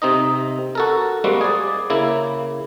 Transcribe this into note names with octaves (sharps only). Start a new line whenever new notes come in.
C3 C4 D#4 D#5
F#4 A4 A#4
G3 G#3 A#3 C4 F#4
G#4 D5
C#3 A#3 E4